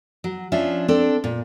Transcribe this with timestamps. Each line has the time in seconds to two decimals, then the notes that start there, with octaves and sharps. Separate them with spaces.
0.24 F#3
0.52 F3 C#4 D4 F4 E5
0.88 C4 D4 A4
1.24 A#2